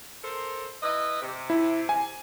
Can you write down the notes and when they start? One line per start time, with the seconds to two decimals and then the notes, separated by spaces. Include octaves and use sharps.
0.24 A4 A#4 C5
0.83 E4 B4 D#5
1.22 C3
1.50 E4
1.89 G#5